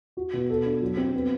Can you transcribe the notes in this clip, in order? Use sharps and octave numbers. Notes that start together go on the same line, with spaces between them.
F#4
B2
A4
D4
F#3
C4
B3